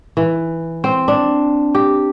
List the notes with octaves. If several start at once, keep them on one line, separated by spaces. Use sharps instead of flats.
E3
C4
D4
G4